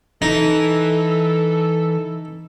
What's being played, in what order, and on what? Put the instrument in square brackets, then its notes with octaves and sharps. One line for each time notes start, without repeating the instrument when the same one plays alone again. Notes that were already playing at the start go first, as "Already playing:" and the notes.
[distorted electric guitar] E3 [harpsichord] D#4 [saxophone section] A4